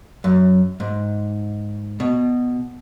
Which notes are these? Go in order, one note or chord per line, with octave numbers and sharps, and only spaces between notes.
F#2
G#2
B2